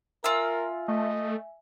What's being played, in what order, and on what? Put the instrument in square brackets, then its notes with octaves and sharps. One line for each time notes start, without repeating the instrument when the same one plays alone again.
[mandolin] F4 E6 [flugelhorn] A#4 [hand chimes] E5 G#5
[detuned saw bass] A3 [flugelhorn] D#5